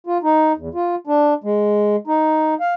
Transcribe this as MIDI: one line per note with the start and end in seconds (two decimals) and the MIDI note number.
0.07 0.18 65
0.23 0.52 63
0.57 0.69 40
0.74 0.95 65
1.07 1.34 62
1.44 1.96 56
2.07 2.54 63
2.60 2.74 77